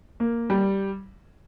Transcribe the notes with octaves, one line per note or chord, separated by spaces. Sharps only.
A#3
G3